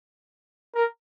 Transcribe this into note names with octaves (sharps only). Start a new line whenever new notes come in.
A#4